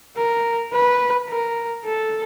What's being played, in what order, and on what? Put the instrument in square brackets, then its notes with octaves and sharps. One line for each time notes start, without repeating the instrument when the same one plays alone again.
[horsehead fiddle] A#4
B4
A#4
A4